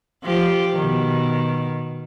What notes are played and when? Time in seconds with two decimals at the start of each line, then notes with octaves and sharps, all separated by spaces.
0.23 F3 G4
0.76 B2 D#3